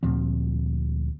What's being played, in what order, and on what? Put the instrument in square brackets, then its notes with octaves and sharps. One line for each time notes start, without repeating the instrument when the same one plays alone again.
[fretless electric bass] D2 A#2 F3 C4